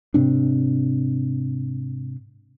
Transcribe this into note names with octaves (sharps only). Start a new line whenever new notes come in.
G#2 C3 C4 D4